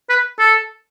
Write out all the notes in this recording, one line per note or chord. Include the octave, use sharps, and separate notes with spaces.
B4
A4